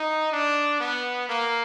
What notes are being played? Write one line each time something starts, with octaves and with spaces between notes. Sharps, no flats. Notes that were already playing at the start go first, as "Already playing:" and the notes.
Already playing: D#4
D4
B3
A#3